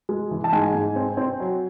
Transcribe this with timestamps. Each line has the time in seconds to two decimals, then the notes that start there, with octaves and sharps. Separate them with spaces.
0.09 G#3
0.31 E3
0.44 A5
0.53 G#2 G#5
0.75 G#2
0.96 C4
1.17 C4
1.40 F#3